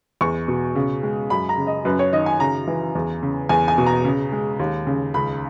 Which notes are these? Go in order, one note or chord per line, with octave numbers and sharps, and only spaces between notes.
E2 C#6
B2
C#3
G#3
F#2 B5
A#5
C#3
D#5
F#2 B4
C#5
D#3 D#5
G#5
C#3 A#5
E3
E2
C#3
E2 G#5
G#5
B2
A#5
C#3
G#3
D#2
C#3
C#2 B5